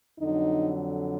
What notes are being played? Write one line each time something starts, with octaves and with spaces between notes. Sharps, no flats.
F2 D3 F#3 D#4